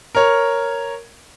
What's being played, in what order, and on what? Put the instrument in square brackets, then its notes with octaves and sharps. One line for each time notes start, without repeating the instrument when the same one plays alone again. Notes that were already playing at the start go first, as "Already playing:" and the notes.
[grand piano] A#4 C#5